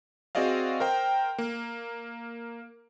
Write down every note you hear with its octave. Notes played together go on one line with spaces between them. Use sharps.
C4 F#4 G#4 D5 D#5 F5
A#4 C5 G5
A#3